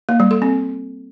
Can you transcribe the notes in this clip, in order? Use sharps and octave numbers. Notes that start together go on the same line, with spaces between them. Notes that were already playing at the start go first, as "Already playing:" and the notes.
A#3
G3
A4
C4